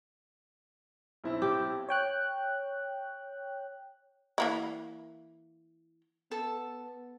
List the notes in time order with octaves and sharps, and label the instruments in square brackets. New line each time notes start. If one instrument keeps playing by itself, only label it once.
[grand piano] B1 C4 E4
[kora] G4
[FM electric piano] C#5 G5 F#6
[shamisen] E3 A#3 E4
[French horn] B3 [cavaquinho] A4